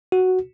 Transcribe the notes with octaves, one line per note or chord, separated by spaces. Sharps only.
F#4